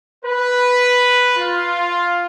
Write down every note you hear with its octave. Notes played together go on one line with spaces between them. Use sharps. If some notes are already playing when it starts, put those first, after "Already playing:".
B4
F4